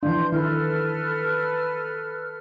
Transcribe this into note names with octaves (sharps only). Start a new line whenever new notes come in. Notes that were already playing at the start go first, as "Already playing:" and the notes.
E3 F3 D4 C6 G6
D#3 E4 A4 B4 F6